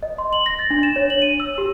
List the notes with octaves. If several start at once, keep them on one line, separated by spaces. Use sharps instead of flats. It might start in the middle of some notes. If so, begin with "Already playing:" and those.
D#5
C6
F#7
A#6
A6
D4
E7
C#5
F#7
D#7
E6
G4